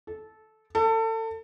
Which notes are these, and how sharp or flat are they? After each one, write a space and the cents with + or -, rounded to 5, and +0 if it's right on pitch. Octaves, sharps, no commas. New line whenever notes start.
A4 -15
A4 +30